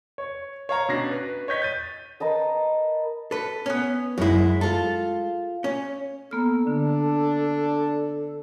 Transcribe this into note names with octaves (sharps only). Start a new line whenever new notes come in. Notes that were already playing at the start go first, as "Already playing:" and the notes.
C#5
C#5 F5 A#5
B2 C#4 D4 A#6 C7
B4
C#5 D#5 G6 B6
G6 A6 D#7
A#4 B4 D#5 A5
A4 B4
B3 C#4
F#2 G#3 E4 F#4
F4 A4
C#4
A#3 B3 A4 F6
D3 D4